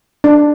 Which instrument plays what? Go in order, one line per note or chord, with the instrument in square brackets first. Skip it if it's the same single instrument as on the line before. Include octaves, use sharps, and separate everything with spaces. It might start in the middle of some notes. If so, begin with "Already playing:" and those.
[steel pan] D4